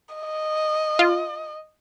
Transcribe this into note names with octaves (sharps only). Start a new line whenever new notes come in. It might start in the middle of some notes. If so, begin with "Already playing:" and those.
D#5
F4